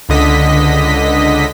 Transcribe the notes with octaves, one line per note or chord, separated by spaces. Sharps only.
C#2 D3 D#5 B6